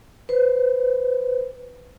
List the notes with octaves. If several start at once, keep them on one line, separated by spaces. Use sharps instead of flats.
B4 C5